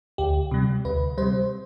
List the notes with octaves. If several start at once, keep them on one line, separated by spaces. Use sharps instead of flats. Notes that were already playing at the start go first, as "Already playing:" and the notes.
D2 G4
C3 G3
D2 B4
C3 G3 C5